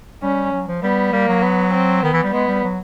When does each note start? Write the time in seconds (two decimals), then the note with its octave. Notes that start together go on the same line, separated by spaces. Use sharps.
0.23 G3 C#4
0.52 F#3
0.68 F3
0.82 G3 B3
1.12 G3 A#3
1.28 F#3
1.42 B3
1.73 C4
2.03 D#3 B3
2.13 E3
2.23 G3
2.32 G#3 B3
2.48 G3
2.64 F#3